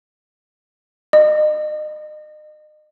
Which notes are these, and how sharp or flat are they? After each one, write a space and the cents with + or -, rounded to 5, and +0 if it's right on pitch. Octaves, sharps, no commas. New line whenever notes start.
D#5 -35